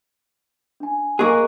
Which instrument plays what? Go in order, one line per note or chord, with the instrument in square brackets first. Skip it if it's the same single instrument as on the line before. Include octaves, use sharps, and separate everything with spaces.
[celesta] D4 G#5
[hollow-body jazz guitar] A#3 G#4 [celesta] D#5 C#6 F#6